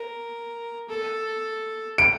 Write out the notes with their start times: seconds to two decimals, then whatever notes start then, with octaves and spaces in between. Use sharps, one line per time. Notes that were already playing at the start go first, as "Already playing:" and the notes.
Already playing: A#4
0.89 A4
1.98 D7